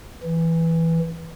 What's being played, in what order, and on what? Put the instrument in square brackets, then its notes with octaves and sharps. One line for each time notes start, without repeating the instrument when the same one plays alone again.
[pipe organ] E3